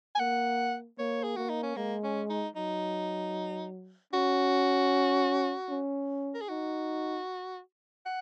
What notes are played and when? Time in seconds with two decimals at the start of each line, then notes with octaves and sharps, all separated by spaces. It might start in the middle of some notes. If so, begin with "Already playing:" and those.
0.15 G#5
0.19 A#3 F#5
0.99 A#3 C#5
1.23 G#4
1.36 A#3 F#4
1.49 D#4
1.63 C#4
1.76 G#3 A#3
2.03 C#4
2.30 D#4
2.56 F#3 D#4
4.13 C#4 F#4
5.70 C#4
6.34 A#4
6.41 G#4
6.49 D#4 F#4
8.06 F#5